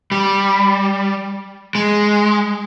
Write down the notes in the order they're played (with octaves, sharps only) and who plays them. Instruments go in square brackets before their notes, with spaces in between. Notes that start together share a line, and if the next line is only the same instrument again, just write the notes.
[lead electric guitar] G3
G#3